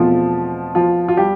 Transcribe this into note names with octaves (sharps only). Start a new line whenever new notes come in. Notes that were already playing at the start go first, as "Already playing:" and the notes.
Already playing: E2 B2 F3 A3 C4 F4
F3 F4
F4
G3 G4